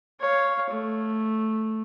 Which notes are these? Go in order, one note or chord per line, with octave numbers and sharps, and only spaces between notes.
C#5 F5
A3